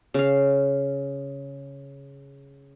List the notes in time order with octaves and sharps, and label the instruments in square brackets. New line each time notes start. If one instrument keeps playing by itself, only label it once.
[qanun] C#3 F5